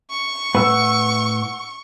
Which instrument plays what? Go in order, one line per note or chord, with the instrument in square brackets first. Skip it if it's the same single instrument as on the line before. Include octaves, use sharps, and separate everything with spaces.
[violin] C#6
[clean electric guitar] A2 B4 B5 [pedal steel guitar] F#5 E6